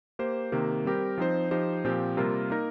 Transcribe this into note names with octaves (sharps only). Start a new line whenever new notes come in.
A#3 G4 C5
C3 D#3 A#3 G4
G3 C4 G4 A#4
F3 C4 D#4 C5
F3 D#4 G4 C5
A#2 F3 C4 G4
C3 G3 A#3 F4 A#4
A#3 D#4 A#4